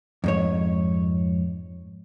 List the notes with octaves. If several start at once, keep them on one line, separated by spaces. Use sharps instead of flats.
F2 G#2 C#5